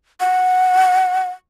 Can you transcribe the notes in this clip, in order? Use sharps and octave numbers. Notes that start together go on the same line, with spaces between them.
F#5